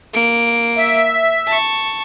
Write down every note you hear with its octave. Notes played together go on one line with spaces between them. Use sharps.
A#3 D7
E5
A5 C#6